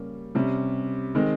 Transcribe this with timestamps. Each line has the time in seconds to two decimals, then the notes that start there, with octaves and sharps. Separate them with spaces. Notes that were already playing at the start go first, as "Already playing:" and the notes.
Already playing: C#3 G3 A#3 C#4
0.35 C3 G3 C#4
1.15 D#3 G#3 C4